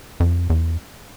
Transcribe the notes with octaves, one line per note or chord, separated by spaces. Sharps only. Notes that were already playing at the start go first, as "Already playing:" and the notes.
F2
E2